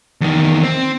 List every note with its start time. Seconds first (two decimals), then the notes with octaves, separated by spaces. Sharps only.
0.21 E2 D#3
0.63 C4